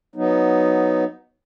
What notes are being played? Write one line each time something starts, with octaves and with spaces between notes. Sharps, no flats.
F#3 B3 D#4